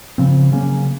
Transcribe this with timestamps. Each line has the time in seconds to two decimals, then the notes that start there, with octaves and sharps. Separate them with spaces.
0.18 C#3 F3 C4
0.52 C#3 F#3 A#3 C#4